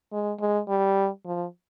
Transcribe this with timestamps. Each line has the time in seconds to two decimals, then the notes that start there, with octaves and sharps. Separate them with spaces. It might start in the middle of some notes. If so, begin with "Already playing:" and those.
0.12 G#3
0.40 G#3
0.69 G3
1.25 F3